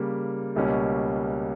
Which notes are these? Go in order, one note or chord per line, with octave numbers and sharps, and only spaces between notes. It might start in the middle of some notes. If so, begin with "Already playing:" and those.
Already playing: C#3 G3 A#3
C#2 B2 G3 A#3 C#4